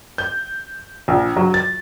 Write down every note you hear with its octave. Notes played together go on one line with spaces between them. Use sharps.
G6
A#1
F#3
A6